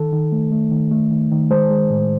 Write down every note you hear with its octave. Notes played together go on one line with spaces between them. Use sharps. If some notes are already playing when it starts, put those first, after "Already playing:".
Already playing: D#3 A4
D#3
A3
A3
D#3
A3
D#3
D#3
G#3 C5
G#3
A2